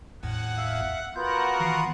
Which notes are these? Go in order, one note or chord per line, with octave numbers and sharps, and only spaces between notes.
G#1 E2 A2 F#5
E5 F5
B3 F4 F#4 A#4 F#5 G6
D#3 E3 C7